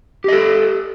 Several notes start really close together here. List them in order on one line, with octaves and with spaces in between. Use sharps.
G4 D#5 A4